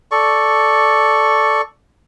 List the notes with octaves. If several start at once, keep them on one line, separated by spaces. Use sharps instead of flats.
A4 D5 C#6